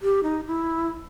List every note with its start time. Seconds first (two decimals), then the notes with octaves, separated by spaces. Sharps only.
0.02 G4
0.23 D#4
0.47 E4